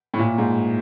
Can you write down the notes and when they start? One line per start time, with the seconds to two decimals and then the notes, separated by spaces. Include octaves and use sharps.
0.14 A2
0.18 A#2
0.38 G#2